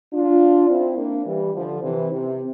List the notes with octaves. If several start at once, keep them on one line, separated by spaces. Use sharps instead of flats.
D4 F4
C4 E4
A#3 D4
E3 G3
D3 F3
C3 E3
C3